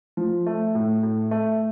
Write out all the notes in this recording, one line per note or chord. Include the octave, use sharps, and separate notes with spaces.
F3
A3
A2
A2
A3